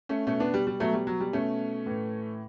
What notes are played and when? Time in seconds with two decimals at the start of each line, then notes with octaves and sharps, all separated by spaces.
0.09 A3 C#4
0.27 B2 A3 C#4
0.40 B3 D4
0.54 G3
0.67 G3
0.80 B2 F#3 A3
0.93 G3
1.07 F#3
1.21 G3
1.33 B2 A3 C#4
1.86 A2 E3